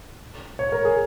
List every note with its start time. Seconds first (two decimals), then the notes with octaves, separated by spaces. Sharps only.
0.59 C#5
0.72 A#4
0.85 G#4